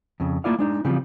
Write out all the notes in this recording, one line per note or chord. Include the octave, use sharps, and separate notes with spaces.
F2 C#3
A3 A#3 E4 F4 D5 F5
G#3 D4 D#4
C#3 E3 F3 G3 C4